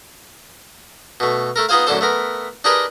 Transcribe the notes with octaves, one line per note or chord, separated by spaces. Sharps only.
B2 A3
A3 A4 A#4
B3 D#4 F4 G#4 C5 F5
F#2 A2 D3 D4 A4 C5
A3 B3 A#4
D4 D#4 G4 G#4 A#4 B4